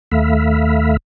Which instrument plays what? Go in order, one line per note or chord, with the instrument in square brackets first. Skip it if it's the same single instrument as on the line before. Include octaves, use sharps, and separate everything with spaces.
[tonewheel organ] D#2 A3 E5 F5 B5